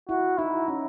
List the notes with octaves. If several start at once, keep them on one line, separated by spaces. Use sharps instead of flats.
E4 F#4
D#4 E4
C#4